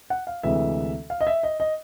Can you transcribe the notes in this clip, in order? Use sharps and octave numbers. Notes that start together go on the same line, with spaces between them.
F#5
F5
D2 C3 E3 G#3 E5
F5
D#5
E5
D#5
D#5